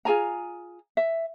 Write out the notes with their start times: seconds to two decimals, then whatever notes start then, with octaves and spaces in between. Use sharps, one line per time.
0.05 F4 G#4 G#5 A#5
0.97 E5